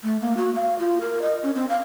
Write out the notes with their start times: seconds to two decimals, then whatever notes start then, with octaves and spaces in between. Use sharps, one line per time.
0.04 A3
0.21 A#3
0.37 F#4
0.55 F5
0.79 F4
1.01 A#4
1.22 D#5
1.43 C#4
1.55 C4
1.69 F5